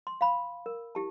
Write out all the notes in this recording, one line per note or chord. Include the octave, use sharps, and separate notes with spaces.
C6
F5 B5
A#4
E4 G4 A5